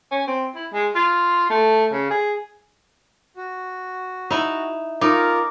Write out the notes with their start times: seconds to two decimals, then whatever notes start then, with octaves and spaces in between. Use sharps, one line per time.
0.11 C#4
0.27 C4
0.55 E4
0.73 G#3
0.95 F4
1.50 A3
1.92 C#3
2.10 G#4
3.37 F#4
4.30 D#4 E4
5.01 D#4 F4 A#4 A#5 D6